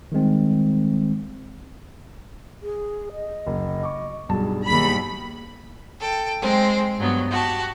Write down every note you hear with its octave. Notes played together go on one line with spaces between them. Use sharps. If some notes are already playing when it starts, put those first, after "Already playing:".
D#3 G3 G#3 C4
G#4
D#5
F#1
C#6 D6
B1 G2 G#4 A5
D#2 G#4 B5
A4 G5
G#3 C4 G5
G2 F#3 B3
F#4 G4 A5